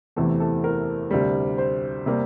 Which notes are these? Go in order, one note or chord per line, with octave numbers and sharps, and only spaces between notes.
E2 C3 E3 A3 A4
A4
A#4
D2 C3 G3
C5
C3 G3 A#3